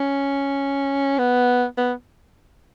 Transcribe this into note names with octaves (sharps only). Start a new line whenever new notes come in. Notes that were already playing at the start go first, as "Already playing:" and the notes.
Already playing: C#4
B3
B3